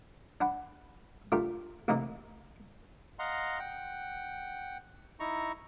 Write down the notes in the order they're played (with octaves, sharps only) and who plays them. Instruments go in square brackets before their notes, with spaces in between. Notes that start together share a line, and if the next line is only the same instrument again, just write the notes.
[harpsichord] D4 F#5 B5
A3 D4 F4 G4 A#4
A1 A2 C3 A#3 D#4 D#5
[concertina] D#5 F5 F#5 A#5 C6
F#5 G5
D#4 E4 A#5 C#6